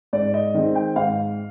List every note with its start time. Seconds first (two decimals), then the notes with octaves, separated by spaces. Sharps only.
0.13 G#2 D5
0.34 D#5
0.54 D#3 G#3 C4
0.75 G5
0.96 G#2 F5